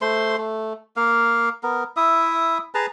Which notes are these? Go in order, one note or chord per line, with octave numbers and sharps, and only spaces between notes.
A3 C5 C6
A3
A#3 F5
B3 A#4
E4 E5 D#6
G#4 B4 A5 A#5